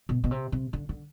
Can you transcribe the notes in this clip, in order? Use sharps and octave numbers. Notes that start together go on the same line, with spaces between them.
B2
B2
C3
C3
D3
D3